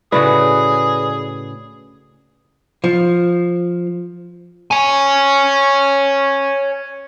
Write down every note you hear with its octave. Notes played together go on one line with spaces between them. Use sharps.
A2 C#3 F#4 G#4 B4 D5 B5
F3
C#5 G#5